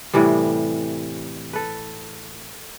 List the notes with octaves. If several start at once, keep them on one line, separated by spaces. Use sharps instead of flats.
A2 C3 E3 G3
A4 B4